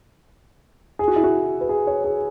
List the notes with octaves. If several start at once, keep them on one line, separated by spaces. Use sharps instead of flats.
G#4
F#4
E4
F#4
B4
G#4
C#5
G#4